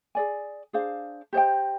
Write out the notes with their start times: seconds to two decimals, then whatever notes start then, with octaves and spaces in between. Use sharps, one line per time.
0.15 G#4 D5 G#5
0.73 D4 G#4 C5 F5
1.33 G4 C5 D#5 G5